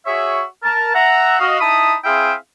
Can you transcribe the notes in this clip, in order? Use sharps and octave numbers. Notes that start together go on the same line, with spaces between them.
F#4 G#4 C#5 E5
A#4 A5
E5 F#5 A#5
F#4 D#5 F5
D#4 E4 A5 B5 D#6
C4 E4 G#4 E5 F5 G5